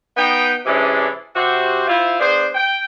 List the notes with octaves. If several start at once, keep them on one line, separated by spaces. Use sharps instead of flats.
B3 D#4 G5
C3 E3 G#3 C#4 D4
C3 F#4 C5
E4 F4 C5
B3 D4 G#4 C5
G5